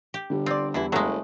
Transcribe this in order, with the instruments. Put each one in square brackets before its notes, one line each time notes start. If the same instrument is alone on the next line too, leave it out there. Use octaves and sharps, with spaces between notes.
[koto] G4
[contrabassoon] G1 [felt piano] D3 G3
[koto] C4 [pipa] F4 D5
[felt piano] E2 G3 [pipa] D3 E3 E4
[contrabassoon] F#1 [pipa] F#3 [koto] G#3 A3